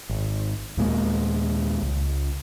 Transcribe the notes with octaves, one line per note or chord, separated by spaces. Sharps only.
G#1
D#2 A#2 G#3 A#3
C#2